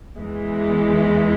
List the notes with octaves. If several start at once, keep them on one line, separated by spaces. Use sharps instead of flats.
E2 E3 G#3